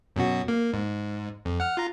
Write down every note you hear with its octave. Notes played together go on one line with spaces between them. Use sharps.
F#2 B2 F#4
A#3
G#2
F2
F#5 F6
F4 A#5